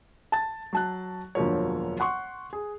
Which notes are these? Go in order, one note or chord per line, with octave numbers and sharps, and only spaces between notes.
A5 A6
F#3 A5 F#6
E1 F#2 D3 F3 A#3 C#5
F#5 C6 C#6
G#4